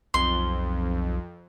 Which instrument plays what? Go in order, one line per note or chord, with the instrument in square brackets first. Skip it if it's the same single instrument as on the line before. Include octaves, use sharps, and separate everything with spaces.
[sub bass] B1 [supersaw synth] F2 [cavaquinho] C6